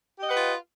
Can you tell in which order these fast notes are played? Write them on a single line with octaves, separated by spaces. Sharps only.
G4 D#5 F#5 B4 F4